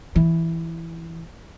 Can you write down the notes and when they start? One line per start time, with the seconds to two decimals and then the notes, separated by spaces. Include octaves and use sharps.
0.16 E3